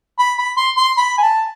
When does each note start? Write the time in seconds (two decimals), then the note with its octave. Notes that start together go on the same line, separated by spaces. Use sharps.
0.19 B5
0.38 B5
0.57 C6
0.77 C6
0.97 B5
1.18 G#5
1.23 A5